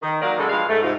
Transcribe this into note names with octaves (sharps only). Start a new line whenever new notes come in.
D#3
D#3 F#3 A#3 A#4 D5 F5
C#3 F#3 G#3 D4 A4
G2 F3 G#3 F5
G#2 A3
G#2 C3 F4